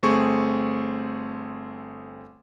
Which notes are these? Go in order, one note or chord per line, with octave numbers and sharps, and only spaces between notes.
G1 A3 C4 G#4 C#6